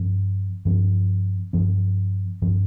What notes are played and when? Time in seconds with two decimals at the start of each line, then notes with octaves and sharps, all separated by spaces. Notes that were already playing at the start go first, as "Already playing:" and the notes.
Already playing: G2 F3 C4
0.65 G2 F3 C4
1.53 G2 F3 C4
2.42 G2 F3 C4